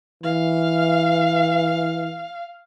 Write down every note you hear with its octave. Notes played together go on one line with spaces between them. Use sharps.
E3 F5